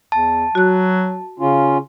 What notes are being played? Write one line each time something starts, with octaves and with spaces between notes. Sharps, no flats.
E2 A5
F#3 F#4 F#6
C#3 C#4 F4